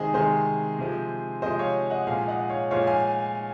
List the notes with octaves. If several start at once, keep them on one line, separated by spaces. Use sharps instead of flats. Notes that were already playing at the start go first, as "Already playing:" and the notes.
Already playing: C3 D#3 G#3 G#4 C5 D#5
C3 D#3 G#3 G#4 C5
C3 F3 G#3
C3 F3 G#3 C5 D#5
C#5 F5
D#5 F#5
A#2 F3 G#3 F5 G#5
D#5 F#5
C#5 F5
A#2 F3 G#3 C#5 F5
F5 G#5